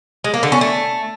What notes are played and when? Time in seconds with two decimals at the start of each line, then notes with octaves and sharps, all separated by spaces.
0.24 G#3
0.34 A#3
0.43 D3
0.52 C#4
0.61 A3